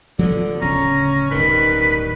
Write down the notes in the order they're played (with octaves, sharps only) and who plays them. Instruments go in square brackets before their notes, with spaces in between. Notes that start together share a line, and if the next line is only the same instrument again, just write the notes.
[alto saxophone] D3 [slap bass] F3 F#3 B3
[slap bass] D1 C#3 [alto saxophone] C#4 [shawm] A#5
[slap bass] D1 G2 [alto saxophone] D#3 [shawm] B4